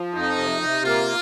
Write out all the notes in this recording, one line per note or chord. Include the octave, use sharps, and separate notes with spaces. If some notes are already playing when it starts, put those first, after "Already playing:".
Already playing: F3
F2 D#4
C3
C3
A#3 F4